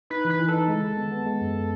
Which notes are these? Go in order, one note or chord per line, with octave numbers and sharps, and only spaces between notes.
D#4 B4
E3
B4
E3
A4
D#4
G#3
D#3
B3
B3
G#3
F#2